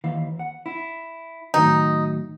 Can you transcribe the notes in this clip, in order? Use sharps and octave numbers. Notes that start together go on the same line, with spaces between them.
D#2 E3 F5
F#5
E4
A2 D#3 F#3 D#4